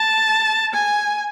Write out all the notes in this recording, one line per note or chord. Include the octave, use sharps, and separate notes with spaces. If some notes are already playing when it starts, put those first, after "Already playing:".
Already playing: A5
G#5